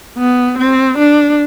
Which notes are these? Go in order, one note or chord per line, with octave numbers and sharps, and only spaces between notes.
B3
C4
D4